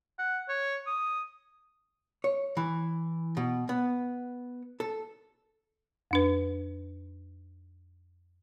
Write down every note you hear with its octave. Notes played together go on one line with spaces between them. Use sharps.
F#5
C#5
D#6
C#5
E3
B2
B3
A4
F2 D4 B4